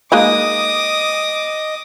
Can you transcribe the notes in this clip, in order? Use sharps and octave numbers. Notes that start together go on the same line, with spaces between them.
G#3 A#3 D#4 D#5 D6 D#6